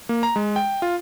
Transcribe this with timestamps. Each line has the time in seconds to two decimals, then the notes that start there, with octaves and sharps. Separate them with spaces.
0.09 A#3
0.23 A#5
0.36 G#3
0.56 G5
0.82 F4